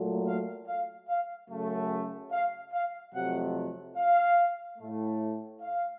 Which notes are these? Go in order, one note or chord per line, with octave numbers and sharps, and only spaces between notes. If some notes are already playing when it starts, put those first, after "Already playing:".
Already playing: A#2 F#3 A3
F5
F5
F5
F#2 C#3 F#3 A3
F5
F5
F2 C3 F#3 A3 F#5
F5
A2 A3
F5